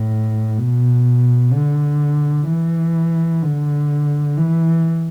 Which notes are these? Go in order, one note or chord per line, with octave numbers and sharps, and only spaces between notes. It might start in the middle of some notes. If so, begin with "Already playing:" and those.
Already playing: A2
B2
D3
E3
D3
E3